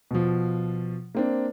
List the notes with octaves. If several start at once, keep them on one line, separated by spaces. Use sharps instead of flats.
B2 F3
A#3 C4 D4